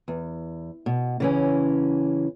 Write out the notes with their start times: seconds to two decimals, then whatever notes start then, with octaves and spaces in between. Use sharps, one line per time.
0.08 E2
0.86 B2
1.20 C#3 E3 C#4